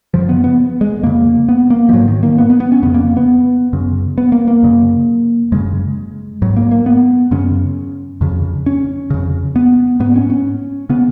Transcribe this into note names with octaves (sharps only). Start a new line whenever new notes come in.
F#2 C#3 F3
B3
B3
G#3
F2 C#3 A#3
B3
A#3
F3
G#2 F#3
D#3
A#3
B3
B3
B3
C#4
F2 C#3 B3
A#3
B3
F#2 C#3
B3
A#3
A#3
F#2 C#3
F#2 C#3 G#3
G#2 F#3
A#3
A#3
B3
F#2 C#3 C#4
F2 C#3
C#4
F2 C#3
B3
G#2 B3
C#4
C#4
C#3 B3